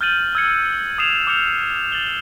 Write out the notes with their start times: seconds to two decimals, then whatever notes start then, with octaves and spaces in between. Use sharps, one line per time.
0.01 F6 G6 A6 D#7 F#7
0.35 E6 G#6 C#7
0.98 D#6 G#6 C7 E7 F7
1.27 D6 F6 G6 C#7 F7
1.92 A6 F#7 G7